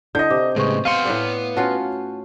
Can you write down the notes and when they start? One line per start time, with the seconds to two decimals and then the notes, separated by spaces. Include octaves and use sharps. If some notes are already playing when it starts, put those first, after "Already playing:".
0.15 D3 E4 D5 D#5 G6
0.30 C3 D6
0.56 A2 C#3 G#3 B4 C#6
0.85 B3 F5 C6 F6 C#7 D#7
1.05 A2 B4 D5
1.56 C#4 F4 F#4 F#5 A5